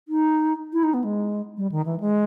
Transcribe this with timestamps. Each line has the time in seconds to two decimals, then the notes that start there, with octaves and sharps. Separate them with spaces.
0.08 D#4
0.73 E4
0.83 D#4
0.94 B3
1.04 G#3
1.57 G3
1.72 D#3
1.86 E3
2.00 G#3